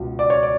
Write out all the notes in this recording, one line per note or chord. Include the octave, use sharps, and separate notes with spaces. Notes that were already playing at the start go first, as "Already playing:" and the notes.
Already playing: C#2 B2
D5
C#5
D5